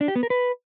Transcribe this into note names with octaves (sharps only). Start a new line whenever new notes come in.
D4
G4
B3
A#4
B4